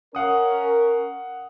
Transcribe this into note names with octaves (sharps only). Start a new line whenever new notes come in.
C#4 A#4 F5 F#5 D#6